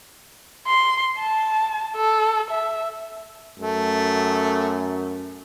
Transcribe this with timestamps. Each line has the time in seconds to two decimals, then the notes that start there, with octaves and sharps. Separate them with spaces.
0.67 C6
1.19 A5
1.96 A4
2.51 E5
3.59 F#2 A3